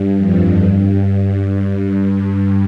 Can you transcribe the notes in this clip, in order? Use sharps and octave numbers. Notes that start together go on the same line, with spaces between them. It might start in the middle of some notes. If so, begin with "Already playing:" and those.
Already playing: G2
F2
G2